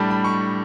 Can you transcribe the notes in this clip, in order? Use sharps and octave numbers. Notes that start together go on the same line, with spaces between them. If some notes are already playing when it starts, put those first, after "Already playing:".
Already playing: A2 G3 D4 A5
B5
C#6